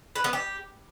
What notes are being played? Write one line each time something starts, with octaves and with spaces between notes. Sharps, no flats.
B4
B3
G4